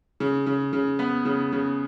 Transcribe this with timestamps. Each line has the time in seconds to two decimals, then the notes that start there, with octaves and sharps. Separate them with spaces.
0.20 C#3
0.46 C#3
0.73 C#3
0.99 B3
1.25 C#3
1.52 C#3